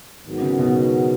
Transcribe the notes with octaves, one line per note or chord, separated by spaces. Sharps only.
G#2 D#3 F#3 B3 F#4
C#3
B2